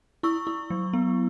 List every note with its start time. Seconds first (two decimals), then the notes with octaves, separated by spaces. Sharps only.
0.23 E4 C#6 E6
0.47 E4
0.70 F#3
0.93 B3